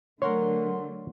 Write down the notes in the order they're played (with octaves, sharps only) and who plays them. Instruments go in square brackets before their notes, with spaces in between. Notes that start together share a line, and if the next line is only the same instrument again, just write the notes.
[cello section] D3 F#3 A3 [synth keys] A#4 F#5 C6 [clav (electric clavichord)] C#5